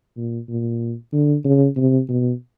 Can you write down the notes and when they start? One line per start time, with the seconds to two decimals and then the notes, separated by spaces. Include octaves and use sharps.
0.17 A#2
0.49 A#2
1.13 D3
1.45 C#3
1.77 C3
2.09 B2